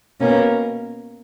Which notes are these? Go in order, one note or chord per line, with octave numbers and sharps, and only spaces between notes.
B2 A#3 C#4